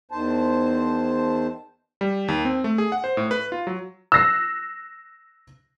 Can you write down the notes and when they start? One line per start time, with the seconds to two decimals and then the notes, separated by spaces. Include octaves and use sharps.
0.11 E2 D#3 C5 A5
2.01 G3
2.28 D#2
2.45 C4
2.64 A3
2.78 G#4
2.92 F#5
3.04 C5
3.17 A2
3.31 B4
3.52 F4
3.67 F#3
4.12 E6 F#6 A#6 C7